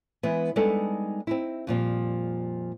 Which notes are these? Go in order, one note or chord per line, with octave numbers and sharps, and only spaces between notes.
E3 G#3 B3
G3 G#3 B3 D4 D#4 A4
C4 D#4 E4
F2 A#2 F3 G3